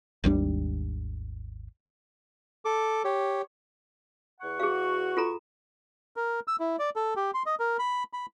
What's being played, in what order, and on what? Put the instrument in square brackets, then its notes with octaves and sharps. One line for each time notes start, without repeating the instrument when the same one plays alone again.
[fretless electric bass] G#1 D#2 G3 D4
[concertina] A4 D6
G4 C#5
[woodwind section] E2 F#5 C#6
[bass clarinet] F#4 [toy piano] G#4 F5
[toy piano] F4 A4 A#5
[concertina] A#4
E6
E4
D5
A4
G4
C6
D#5
A#4
B5
B5